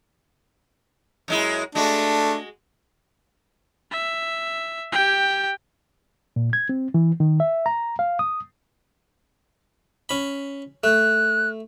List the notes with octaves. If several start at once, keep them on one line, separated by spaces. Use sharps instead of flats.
F#2 G#3 E4
G#3 A3 D4 F#4
E5
G4 G5
A#2
G#6
C4
E3
D#3
E5
A#5
F5
D#6
C#4 B5
A3 F#6